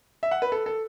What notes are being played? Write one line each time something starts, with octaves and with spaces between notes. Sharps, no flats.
E5
F#5
B4
A4
A4